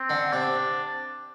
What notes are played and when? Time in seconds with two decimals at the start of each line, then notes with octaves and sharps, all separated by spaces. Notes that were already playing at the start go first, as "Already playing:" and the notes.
Already playing: C4
0.10 D3
0.33 C3 D4